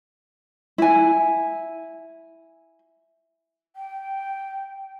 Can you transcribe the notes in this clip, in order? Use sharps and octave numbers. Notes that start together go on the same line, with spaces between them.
E4 G#5
G5